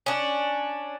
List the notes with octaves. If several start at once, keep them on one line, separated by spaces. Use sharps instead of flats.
C#4 D4